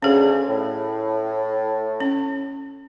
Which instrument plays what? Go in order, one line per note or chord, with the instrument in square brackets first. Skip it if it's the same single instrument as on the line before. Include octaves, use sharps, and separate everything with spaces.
[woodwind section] D2 C#3 [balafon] C#4 G#4
[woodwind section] A2
[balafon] C#4